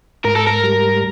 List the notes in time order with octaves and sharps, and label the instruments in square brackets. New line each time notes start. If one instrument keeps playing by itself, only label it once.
[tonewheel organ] G#2 [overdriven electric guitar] A#4
[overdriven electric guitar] A4
A#4
[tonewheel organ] G3